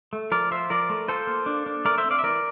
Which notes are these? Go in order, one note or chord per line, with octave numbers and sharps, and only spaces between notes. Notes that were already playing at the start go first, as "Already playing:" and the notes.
A3
F3 A#4 D5
F4 C5 E5
F3 A#4 D5
A3
F4 A4 C5
A#3
D4
D4
A3 A#4 D5
C5 E5
C4
D5 F5
E5
E3 A#4 D5